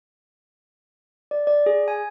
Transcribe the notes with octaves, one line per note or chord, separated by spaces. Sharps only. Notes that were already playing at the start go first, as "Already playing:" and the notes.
D5
D5
G#4
G#5